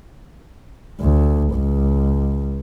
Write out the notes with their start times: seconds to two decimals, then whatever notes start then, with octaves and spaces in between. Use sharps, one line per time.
1.01 D2
1.54 C#2